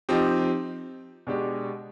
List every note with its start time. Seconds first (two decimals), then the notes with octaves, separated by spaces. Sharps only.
0.09 F3 C4 D#4 G4
1.27 B2 G#3 D4 G4